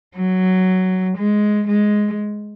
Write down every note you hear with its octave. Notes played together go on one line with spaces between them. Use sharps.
F#3
G#3
G#3